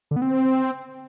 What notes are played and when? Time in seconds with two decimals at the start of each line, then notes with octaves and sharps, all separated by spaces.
0.11 D3
0.16 B3
0.22 C4